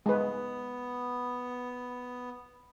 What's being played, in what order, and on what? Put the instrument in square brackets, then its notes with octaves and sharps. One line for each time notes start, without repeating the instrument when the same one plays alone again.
[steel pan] G#3 B4 [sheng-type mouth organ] B3